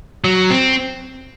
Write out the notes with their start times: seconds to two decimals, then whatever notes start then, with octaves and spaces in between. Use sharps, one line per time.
0.24 F#3
0.50 C4